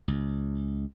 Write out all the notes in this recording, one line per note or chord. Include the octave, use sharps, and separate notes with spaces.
C#2